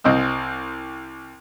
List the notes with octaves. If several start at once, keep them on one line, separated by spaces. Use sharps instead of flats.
C2 C4 D#5 E6